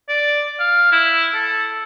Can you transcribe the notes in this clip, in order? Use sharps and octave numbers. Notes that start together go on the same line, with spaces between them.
D5
F5
E4
A4